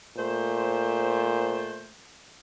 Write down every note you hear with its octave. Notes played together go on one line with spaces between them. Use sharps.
A#2 A3 C5